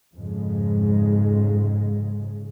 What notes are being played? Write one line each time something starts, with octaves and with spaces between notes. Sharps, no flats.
F2 G#2 C#3 G#3